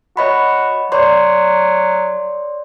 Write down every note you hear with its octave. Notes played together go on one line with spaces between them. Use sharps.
F#4 C#5 D#5 B5
F#3 C#5 D5 C6